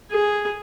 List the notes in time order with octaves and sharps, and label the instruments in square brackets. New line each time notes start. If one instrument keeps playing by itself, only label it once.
[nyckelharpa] G#4